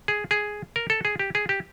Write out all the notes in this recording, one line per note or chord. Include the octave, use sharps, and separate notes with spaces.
G#4
G#4
A#4
A4
G#4
G4
G#4
G4